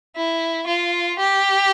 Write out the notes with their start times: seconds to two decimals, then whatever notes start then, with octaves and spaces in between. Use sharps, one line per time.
0.16 E4
0.67 F4
1.19 G4